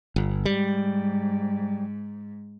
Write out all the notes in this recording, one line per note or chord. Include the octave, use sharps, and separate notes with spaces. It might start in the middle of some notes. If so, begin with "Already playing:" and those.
G1
G#2 G3